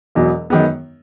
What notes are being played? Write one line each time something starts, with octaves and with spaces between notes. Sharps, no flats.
E1 E2 B2 F#3
F#2 D#3 G#3 B3